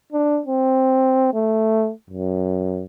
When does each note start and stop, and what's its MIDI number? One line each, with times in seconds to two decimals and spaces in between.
0.13 0.41 62
0.46 1.32 60
1.34 1.91 57
2.10 2.84 42